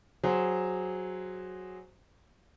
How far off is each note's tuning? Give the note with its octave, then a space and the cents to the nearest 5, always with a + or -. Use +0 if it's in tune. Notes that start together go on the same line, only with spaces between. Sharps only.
F#3 +0 G#4 -10 C5 +0